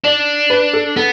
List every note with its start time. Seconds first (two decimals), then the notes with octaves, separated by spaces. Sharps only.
0.04 D4 D5
0.50 B4
0.73 A4
0.96 B3 A4